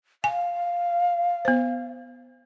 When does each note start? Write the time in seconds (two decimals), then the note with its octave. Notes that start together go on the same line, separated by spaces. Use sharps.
0.24 F5 G#5
1.45 B3 C5